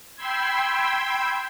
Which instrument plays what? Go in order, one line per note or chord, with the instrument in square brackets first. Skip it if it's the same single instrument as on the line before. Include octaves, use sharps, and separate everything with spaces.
[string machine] G5 B5 C6 E6 G#6